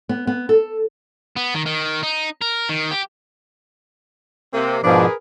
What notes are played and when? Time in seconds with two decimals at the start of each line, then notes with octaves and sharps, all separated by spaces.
0.09 B3
0.27 B3
0.49 A4
1.36 B3
1.54 D#3
1.66 D#3
2.03 D#4
2.42 A#4
2.69 D#3
2.91 G4
4.53 C3 A#3
4.84 G#2 B2 F3 D4 G#4 A#4 B4